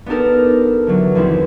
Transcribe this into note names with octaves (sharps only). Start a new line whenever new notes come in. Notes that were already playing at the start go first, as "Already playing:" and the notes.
B3 D4 D#4 G4 A4 A#4
D3 E3 F#3
D#2 E3 F3 C4 E4